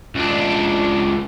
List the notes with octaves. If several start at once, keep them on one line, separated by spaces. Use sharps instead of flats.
C#2 D4